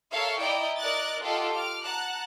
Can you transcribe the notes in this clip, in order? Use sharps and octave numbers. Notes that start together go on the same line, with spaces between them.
A4 A#4 C#5 E5 F5
E4 D5 D#5 G5 A#5
A#4 D5 D#5 F#6 A6
F4 G4 A4 D#5 F5 F#5
D6 F6
F#5 A5 A#5 F#6